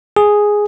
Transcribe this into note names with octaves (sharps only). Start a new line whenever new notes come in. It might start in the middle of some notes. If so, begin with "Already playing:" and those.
G#4